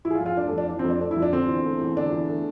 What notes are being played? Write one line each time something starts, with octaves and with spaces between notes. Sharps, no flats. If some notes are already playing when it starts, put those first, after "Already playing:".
E3 E4
G#4
F4
F2
F4
A3 D4
A4
F2
D4
E3 D4
C4
F2
D4
A3 D4
E4
F2
D4
D3 C4
E2
A3
E2
D3 D4
E2
A3